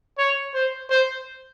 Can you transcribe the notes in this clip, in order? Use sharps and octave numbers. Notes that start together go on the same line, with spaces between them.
C#5
C5
C5